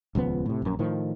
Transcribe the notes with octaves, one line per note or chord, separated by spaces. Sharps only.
D#1 C#2 F3 B3
A2 C3
A#1 F#2
A2 D#3 F3